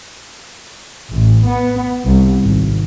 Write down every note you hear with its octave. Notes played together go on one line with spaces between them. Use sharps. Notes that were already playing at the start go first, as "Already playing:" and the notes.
A1
B3
C2
G#1